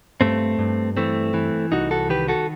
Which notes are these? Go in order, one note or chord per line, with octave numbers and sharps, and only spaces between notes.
G2 A3 C4
G2
E3 A3 C4
E3
C2 D#4 F#4
F#4 A4
D#3 G4 B4
F#4 A4